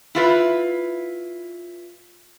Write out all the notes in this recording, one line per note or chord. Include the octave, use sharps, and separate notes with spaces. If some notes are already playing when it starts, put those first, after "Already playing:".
E4 F4 B4